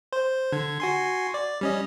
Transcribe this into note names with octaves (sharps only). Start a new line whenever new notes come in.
C5
D3 G#6
F#4 G#5 C6
D5
G3 C#4 D#5